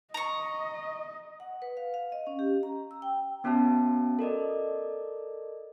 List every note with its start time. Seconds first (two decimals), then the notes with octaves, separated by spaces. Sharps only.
0.14 D#5 A#5 C#6
1.40 F#5
1.62 B4
1.77 F5
1.94 F5
2.12 D#5
2.27 C#4
2.39 G4
2.63 A#5
2.91 E6
3.02 G5
3.44 B3 C#4 F#4 E5 A5
4.19 A4 A#4 D5 D#5